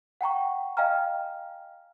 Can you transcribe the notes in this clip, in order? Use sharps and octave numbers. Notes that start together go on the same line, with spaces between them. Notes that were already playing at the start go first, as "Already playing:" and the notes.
F#5 G5 A#5 C#6
D#5 F5 G5 G#5 A#5 F6